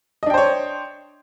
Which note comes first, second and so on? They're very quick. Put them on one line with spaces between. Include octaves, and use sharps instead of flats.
D#5 D4 G5 C5 C#5